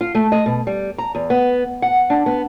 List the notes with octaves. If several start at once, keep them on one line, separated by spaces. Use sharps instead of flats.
F4
A3
D#5
B2
G3
A#5
E2
B3
F#5
D4
B3